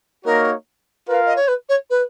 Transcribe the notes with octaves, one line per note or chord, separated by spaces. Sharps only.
A#3 D#4 F#4 A#4 C#5
F4 A#4 B4 F5
D#5
C#5
B4
C#5
B4